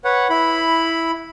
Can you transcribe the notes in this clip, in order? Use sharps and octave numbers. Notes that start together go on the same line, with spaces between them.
B4 C#5 F#5
E4 B5